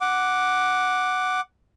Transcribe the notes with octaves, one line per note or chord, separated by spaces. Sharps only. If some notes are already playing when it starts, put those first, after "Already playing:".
F#5 D6